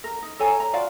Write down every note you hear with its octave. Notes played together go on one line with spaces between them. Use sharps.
A#4
D#4
A4 C#5 G#5 A#5
A#5
F4 F#4 D5 F5